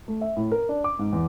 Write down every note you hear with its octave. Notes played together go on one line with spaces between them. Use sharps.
A3
E5
A2
A#4
D4
D6
G#2
E2